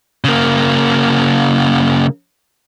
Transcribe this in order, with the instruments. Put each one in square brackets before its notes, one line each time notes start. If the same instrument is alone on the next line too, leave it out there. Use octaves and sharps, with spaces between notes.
[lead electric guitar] C#3 A#3